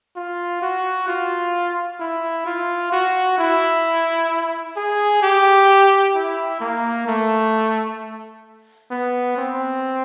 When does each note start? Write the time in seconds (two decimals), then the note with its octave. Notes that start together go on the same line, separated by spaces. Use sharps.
0.16 F4
0.62 F#4
1.08 F4
2.00 E4
2.46 F4
2.93 F#4
3.38 E4
4.76 G#4
5.22 G4
6.15 E4
6.61 A#3
7.07 A3
8.91 B3
9.37 C4